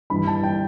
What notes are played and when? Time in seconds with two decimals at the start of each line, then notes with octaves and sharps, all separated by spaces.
0.10 G2 E3 B5
0.27 A5
0.43 G5